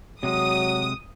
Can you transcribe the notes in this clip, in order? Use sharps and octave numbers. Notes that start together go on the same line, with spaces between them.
C3 F#3 G#3 D#6